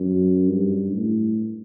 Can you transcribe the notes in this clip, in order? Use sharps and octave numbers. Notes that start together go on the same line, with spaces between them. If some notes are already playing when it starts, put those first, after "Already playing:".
Already playing: F#2
G2
A2